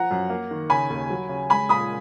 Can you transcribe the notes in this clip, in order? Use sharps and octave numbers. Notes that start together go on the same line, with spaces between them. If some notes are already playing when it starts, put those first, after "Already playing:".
Already playing: F3 F#5 A#5
F#2
A#3
D#3
C#3 G#5 B5
D#2
F#3
C#3
G#3 G#5 B5
A#2 B5 D#6